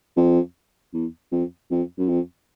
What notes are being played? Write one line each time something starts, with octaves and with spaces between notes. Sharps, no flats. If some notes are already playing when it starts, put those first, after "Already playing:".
F2
E2
F2
F2
F#2
F2